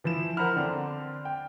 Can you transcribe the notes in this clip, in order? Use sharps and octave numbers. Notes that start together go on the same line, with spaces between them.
E3 F3 E4 E7
A#4 C5 F#5 A#5 B5 F6
D3 C4 D4
G5